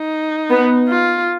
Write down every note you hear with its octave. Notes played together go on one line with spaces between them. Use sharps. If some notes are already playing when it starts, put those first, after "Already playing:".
Already playing: D#4
B3
F4